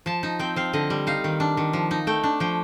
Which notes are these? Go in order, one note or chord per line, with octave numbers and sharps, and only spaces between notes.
F3 A5
D#4
C4 G5
C4 F5
D3 D#5
G3
D#4 F5
D#3
D4
D#3
F3
D#4
A3 G5
D4
F3 G5